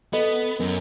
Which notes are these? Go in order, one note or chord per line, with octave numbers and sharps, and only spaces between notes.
B3 A4 D#5 B5
F#2 A#4